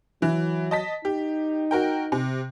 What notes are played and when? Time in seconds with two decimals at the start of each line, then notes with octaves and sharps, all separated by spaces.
0.22 E3 F#3
0.71 D#5 A5 B6
1.05 D#4 G4
1.71 F#4 A#4 G5
2.12 C3